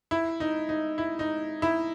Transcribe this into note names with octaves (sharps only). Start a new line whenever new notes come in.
E4
D#4
D#4
E4
D#4
E4